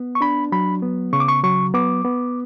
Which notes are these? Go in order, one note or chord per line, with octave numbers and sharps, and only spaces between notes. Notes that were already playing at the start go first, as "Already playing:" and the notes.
Already playing: B3
C#6
D4 B5
F#3 B5
B3
C#3 C#6
D6
C#6
F#3 C#6
B3 D6
B3